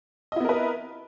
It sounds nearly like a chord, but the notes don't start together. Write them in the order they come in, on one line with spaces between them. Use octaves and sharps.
D#5 E4 B3 A#4 B4